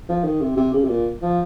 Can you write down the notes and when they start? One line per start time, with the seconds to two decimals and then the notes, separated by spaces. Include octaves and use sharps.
0.09 F3
0.24 D#3
0.41 C3
0.57 C3
0.73 C#3
0.84 C3
0.89 A#2
1.22 F3